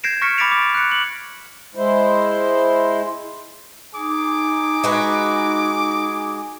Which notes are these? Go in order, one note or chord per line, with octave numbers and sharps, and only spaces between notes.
G6 G#6 A#6 C7 D7 E7
C#6 F6 A#6 B6 C#7
B5 D6 A6 B6 D7 F7
D6
F#6 C#7
F#7
G#3 E4 C5
D#4 G#4 D6
G#3 F#4 B4